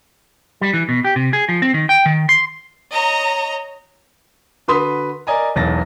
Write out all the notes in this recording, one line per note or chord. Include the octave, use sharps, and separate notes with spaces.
G3
E3
B2
G4
C3
G#4
F3
C4
D#3
G5
D#3
C6
C#5 D#5 A#5
D3 F#4 B4 C6 D#6 B6
A#4 D5 D#5 G#5 A#5
E1 B1 E2 A6 A#6